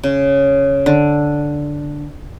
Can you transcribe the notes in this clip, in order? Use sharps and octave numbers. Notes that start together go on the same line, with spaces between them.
C#3
D3